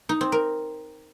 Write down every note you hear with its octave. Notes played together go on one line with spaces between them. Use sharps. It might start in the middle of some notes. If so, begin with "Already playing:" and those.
D#4
C4
A#4